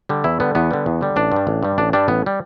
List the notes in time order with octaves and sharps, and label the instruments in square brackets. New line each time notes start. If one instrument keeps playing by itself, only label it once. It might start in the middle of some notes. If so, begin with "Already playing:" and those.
[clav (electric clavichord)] D3 G3
E2 E4
D3 G3 B3
E2 B3
D3 G3
E2
D3 G3
A1 D4
G2 G3
A1
G2 G3
A1 D4
G2 G3 D4
A1 B3
G3